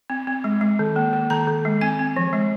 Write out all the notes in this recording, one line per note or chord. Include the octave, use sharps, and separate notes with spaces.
C4
C4
G#3
G#3
D#3
A#3
A#3
D#3 A#5
D#3
G#3
C4 G#5
C4
F3
G#3